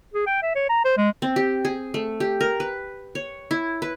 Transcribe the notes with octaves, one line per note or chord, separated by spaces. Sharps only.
G#4
G5
E5
C#5
A#5
C5
G#3
C4
G4
G#4
A3
G4
A#4
B4
C#5
E4
B4